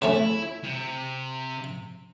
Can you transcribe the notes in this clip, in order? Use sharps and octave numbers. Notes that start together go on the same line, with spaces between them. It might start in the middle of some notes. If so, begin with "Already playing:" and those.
C#3 A3 C#4 E4
C3